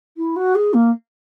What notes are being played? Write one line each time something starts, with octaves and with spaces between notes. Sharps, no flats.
E4
F#4
G#4
A#3